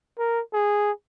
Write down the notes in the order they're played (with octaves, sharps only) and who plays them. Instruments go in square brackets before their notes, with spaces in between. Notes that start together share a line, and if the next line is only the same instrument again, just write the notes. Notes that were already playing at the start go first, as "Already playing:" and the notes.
[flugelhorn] A#4
G#4